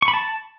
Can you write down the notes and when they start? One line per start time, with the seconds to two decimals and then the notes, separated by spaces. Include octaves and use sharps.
0.02 C#6
0.08 B5
0.14 A5